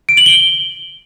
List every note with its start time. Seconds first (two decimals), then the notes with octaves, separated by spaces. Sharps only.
0.09 D7
0.17 F#7
0.26 G7